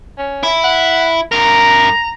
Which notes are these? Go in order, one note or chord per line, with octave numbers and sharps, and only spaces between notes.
C#4
E4
F#5
G2 A#4 A#5